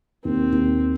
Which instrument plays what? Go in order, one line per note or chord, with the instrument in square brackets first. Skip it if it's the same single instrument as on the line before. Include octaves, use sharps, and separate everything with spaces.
[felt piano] D#2 [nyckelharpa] C4
[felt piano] D#2